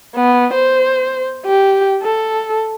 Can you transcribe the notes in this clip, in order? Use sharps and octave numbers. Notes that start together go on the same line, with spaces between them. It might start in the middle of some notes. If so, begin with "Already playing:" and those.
B3
C5
G4
A4